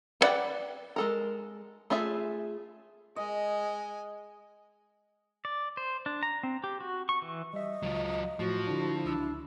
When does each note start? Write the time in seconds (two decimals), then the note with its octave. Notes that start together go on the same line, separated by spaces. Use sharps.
0.21 B3 B4 D5 F#5 G5
0.96 G#3 A4 A#4
1.90 A3 F4 G#4 E5
3.16 G#3 D#5 G#5
5.45 D5
5.77 C5
6.06 D4
6.23 A#5
6.43 C4
6.64 G4
6.81 F#4
7.09 C#6
7.22 E3
7.54 G3 D#5 E5
7.83 C#2 F#3 F4
8.39 A2 F3 F#4
8.67 D3 D4 E4
9.06 C#2 D4 E6